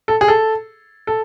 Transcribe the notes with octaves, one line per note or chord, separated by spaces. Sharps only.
A4
G#4
A4
A4